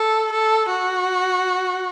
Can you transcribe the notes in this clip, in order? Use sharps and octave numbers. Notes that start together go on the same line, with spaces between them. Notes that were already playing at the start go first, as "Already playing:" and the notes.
Already playing: A4
A4
F#4